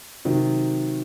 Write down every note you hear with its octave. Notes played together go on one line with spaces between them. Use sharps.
C3 D#3 F#3